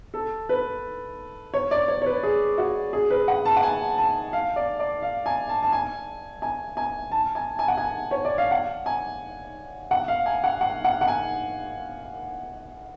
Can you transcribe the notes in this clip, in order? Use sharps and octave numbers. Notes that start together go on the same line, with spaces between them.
A4
B4
C#5
D5
C#5
C#5
B4
G#4
F#4
G#4
B4
F#5
A5
F#5
G#5
A5
F5
D5
D5
F5
G#5
A5
A5
G#5
G#5
G#5
A5
G#5
G#5
F#5
G#5
C#5
D5
F5
F#5
G#5
F#5
F5
G#5
F#5
F#5
F#5
F#5
G#5